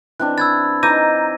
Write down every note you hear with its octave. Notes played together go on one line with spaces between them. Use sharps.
E3 C4 D4 F#6
B5 E6 G#6 A6
E3 D#4 A#5 D6 G6 A#6 D#7